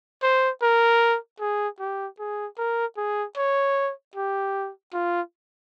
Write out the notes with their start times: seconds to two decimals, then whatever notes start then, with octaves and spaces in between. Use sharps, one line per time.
0.22 C5
0.62 A#4
1.40 G#4
1.79 G4
2.19 G#4
2.58 A#4
2.97 G#4
3.36 C#5
4.15 G4
4.93 F4